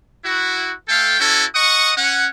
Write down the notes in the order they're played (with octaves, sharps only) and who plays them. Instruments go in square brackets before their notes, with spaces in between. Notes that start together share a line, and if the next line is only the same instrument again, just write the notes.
[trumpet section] E4 F#4
A3 A4 F5 G5
C#4 E4 F#4 A4
D#5 F#5 C#6 D#6
C#4 F#5